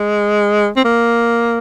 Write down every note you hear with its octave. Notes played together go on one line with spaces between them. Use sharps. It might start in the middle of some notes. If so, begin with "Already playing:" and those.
Already playing: G#3
C4
A#3